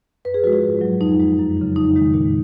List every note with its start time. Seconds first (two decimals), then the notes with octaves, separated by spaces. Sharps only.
0.25 F#2 B4
0.34 G#4
0.44 F3 G#3 F#4
0.53 F4
0.63 G#2
0.81 F#3
1.01 F2 D#4
1.20 F3 G#3
1.39 F#2
1.57 C#3 F#3
1.76 F2 D#4
1.96 D#3 G#3
2.14 A#2